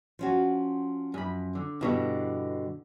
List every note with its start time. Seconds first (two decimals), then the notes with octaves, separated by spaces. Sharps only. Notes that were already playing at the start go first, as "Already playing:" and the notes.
0.19 F3 C#4 F#4
1.14 F#2 B5
1.55 D3
1.81 G2 B2 D3 E4